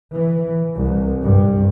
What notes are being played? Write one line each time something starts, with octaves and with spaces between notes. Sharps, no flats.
E3
C2
G2